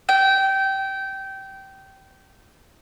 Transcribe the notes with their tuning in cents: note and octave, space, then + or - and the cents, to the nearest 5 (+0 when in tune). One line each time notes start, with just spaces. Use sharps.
G5 -20